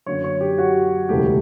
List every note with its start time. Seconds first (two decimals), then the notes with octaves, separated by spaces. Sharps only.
0.06 F#2 D3 F#3 A#3 C#5
0.24 C#5
0.41 G4
0.58 F#4
1.09 E1 D2 C#3 E3 G4